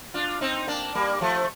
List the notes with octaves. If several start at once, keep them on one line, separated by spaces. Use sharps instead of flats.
D4 F4
C4 D#4
A#3 D4
G3 A#3
F3 A3